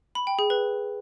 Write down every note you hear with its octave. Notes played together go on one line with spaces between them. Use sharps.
B5
G5
G#4
B4